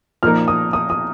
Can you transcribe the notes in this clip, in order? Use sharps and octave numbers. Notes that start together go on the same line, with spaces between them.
A#2 F3 A#3 D#4 A#4 F6
D#6
D#6
D#6